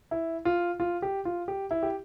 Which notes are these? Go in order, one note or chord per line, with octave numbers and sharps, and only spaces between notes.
E4
F4
F4
G4
F4
G4
E4
G4